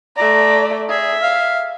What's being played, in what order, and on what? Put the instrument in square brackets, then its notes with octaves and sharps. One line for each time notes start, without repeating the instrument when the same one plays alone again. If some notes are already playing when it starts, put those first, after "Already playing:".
[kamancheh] A3 D5 [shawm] A#5
[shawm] G#4 [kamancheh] E5
[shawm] F5